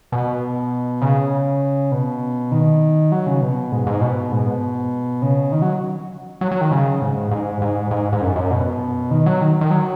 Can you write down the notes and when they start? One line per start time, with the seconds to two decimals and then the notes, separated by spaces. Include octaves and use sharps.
0.12 B2
1.01 C#3
1.92 B2
2.52 D#3
3.12 F#3
3.27 C#3
3.41 B2
3.72 G#2
3.87 G#2
4.01 B2
4.32 G#2
4.47 B2
5.22 C#3
5.52 D#3
5.62 F#3
6.41 F#3
6.51 F#3
6.61 D#3
6.72 C#3
7.02 G#2
7.31 G#2
7.62 G#2
7.91 G#2
8.13 G#2
8.21 F#2
8.36 F#2
8.51 B2
9.11 D#3
9.26 F#3
9.41 D#3
9.61 D#3
9.71 F#3